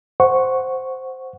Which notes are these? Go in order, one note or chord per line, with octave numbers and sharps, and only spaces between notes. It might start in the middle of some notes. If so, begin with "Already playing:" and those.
C5 F#5 C#6